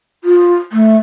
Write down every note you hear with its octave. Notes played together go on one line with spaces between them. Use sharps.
F4
A3